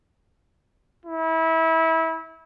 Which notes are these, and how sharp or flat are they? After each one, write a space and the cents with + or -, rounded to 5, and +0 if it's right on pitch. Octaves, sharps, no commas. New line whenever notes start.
E4 -25